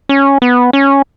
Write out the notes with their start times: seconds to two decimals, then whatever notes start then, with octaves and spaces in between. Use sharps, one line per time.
0.09 C#4
0.42 B3
0.73 C#4